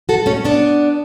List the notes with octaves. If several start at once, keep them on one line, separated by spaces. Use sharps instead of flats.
F#4 A4
A3 C#4
B3 D4